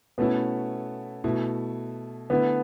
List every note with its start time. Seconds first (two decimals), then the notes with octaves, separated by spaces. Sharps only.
0.18 B2 A3 B3 C#4 E4
1.24 B2 A3 E4
2.30 D3 A3 B3 E4